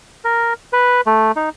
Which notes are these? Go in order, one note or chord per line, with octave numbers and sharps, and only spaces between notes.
A#4
B4
A3
D#4